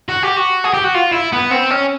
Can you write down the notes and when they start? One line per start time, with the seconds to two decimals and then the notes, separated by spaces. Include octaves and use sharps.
0.09 F#4
0.23 G4
0.37 F#4
0.64 G#4
0.74 G4
0.84 F#4
0.95 F4
1.12 E4
1.32 B3
1.51 C4
1.70 C#4